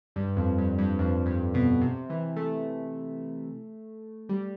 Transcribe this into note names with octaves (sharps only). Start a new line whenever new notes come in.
G2
F2
G2
G2
F2
G2
B2
C3
E3
A3
G3